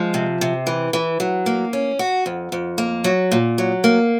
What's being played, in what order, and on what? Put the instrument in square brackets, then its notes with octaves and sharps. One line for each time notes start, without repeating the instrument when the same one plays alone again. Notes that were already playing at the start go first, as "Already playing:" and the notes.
Already playing: [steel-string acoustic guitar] F3 G#3
C3
C3
E3
E3
F#3
A#3
C#4
F#4
F2
F2
A#3
F#3
A#2
F#3
A#3